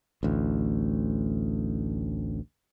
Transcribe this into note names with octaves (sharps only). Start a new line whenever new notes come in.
A1 D2